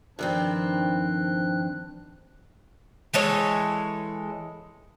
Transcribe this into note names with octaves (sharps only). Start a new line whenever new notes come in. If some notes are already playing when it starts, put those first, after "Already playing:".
G2 D#3 F3 C4 D4 F#6
E3 G#3 A4 C#5